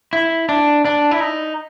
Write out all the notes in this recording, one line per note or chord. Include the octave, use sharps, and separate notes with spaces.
E4
D4
D4
E4
D#4